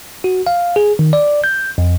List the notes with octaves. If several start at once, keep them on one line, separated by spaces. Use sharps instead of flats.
F#4
F5
G#4
D#3
D5
G6
F2